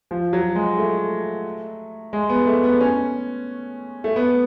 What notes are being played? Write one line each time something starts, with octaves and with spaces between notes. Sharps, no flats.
F3
F#3
G#3
A3
G#3
B3
A3
B3
C#4
A3
B3